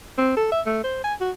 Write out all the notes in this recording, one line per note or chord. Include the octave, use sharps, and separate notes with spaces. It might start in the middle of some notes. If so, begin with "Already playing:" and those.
C4
A4
E5
A3
C5
G#5
F#4